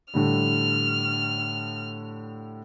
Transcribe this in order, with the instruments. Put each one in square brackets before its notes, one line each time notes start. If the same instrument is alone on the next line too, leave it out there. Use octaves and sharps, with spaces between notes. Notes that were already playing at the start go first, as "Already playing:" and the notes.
[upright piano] A2 D3 G3 [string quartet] F6